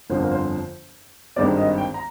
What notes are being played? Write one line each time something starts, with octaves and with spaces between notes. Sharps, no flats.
G1 F2 D3 F3 C5
A#4
C5
G#1 G2 D#3 G#3 C4 D5
D#5
G5
A#5